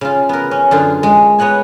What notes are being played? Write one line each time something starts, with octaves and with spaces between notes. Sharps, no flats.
C#3 F4
B3 A#4
C#4
F#2 D3 F4 G#4
G#3
B3 C#5 D#5 F#5 G#5